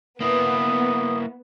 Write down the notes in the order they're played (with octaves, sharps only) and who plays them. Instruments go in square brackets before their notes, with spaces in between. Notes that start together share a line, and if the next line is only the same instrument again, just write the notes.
[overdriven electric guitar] A#3 E4 [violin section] B3 [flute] D#6